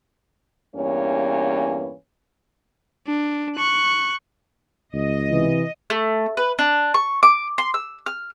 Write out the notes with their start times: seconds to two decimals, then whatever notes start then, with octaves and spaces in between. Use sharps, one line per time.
0.75 E2 G2 E3 A#3 C#4 C#5
3.07 D4
3.57 C#6 F#6
4.94 C#2 D#5
5.29 C3 E3
5.90 A3
6.37 B4
6.59 D4
6.94 C#6
7.23 D6
7.58 C6
7.74 E6
8.06 F6